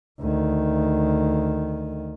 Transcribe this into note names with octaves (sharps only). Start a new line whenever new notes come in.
D2 D#3